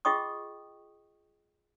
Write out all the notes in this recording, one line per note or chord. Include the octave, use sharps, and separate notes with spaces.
F4 G#4 D#5 G5 C#6 D#6